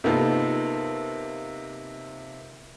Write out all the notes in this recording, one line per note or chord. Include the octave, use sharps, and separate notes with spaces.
C3 A#3 B3 D#4 F4 A4